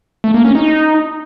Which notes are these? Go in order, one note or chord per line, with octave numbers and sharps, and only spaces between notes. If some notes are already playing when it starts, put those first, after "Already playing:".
A3
A#3
C#4
D#4